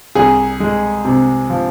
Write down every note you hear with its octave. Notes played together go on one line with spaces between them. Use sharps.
C2 G#4
G#3
C3
F3